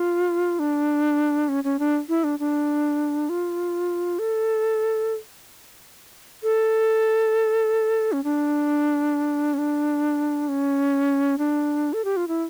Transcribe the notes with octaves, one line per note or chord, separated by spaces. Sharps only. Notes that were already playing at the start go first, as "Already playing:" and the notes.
Already playing: F4
D4
C#4
C#4
D4
E4
D4
D4
F4
A4
A4
C#4
D4
C#4
D4
C#4
D4
A4
G4
F4
E4